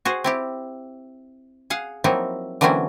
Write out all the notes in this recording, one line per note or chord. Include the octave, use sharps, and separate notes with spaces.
F#4 G#4 C5
C4 E4 G4
G#4 F5 F#5
F3 F#3 A#3 C4 D#4 E4
D3 E3 F#3 A#3 C4 C#4